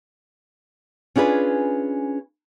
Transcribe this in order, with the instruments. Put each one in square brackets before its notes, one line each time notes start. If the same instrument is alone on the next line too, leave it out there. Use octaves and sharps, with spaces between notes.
[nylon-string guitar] C#4 D4 F4 G#4 B4